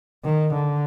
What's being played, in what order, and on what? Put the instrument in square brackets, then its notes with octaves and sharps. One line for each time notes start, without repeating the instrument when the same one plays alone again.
[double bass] D#3
D3